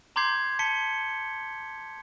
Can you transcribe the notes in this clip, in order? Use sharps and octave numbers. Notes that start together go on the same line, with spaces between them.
A#5 C6 D6 G6 G#6 C7
A5 B6 C#7 G7